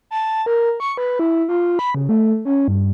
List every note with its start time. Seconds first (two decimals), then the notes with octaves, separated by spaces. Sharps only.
0.11 A5
0.46 A#4
0.80 C#6
0.97 B4
1.19 E4
1.49 F4
1.79 B5
1.95 C#3
2.09 A3
2.45 C#4
2.68 G2